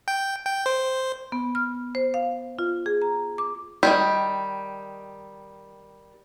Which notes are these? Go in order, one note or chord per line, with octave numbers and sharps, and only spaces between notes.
G5
G5
C5
B3
F6
C5
F5
F4
G#4
A#5
D6
D#3 F#3 G3